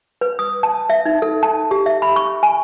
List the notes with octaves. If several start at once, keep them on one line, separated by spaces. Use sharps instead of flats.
B4
D#6
A5
E5
D#4
A4
A5
G4
E5
B5
C#6
G#5